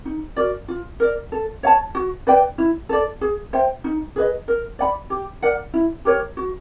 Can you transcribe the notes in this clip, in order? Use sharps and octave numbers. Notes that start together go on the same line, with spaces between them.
D#4
F#4 A#4 D5
F4
A#4 D5
A4
C#5 F5 A5
F#4
B4 D5 G5
E4
A4 D5
G#4
C5 E5 G5
D#4
G#4 B4 D#5
A#4
D5 F#5 B5
G4
A#4 D5 F#5
E4
G4 A#4 C#5
F#4